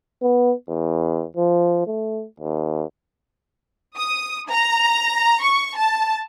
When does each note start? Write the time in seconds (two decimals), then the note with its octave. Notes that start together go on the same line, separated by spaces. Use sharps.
0.22 B3
0.68 E2
1.37 F3
1.87 A3
2.40 D#2
3.98 D#6
4.50 A#5
5.43 C#6
5.77 A5